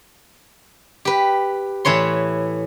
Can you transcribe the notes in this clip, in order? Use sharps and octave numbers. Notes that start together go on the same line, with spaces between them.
G4 B4
A2 E3 B4 C#5 C6